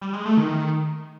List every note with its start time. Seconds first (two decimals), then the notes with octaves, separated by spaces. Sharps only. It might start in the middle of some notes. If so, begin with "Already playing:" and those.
0.01 G3
0.13 G#3
0.25 A3
0.37 D#3